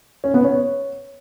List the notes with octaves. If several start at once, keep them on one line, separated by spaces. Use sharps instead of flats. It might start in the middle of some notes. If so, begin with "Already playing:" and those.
C#4
B3
C#5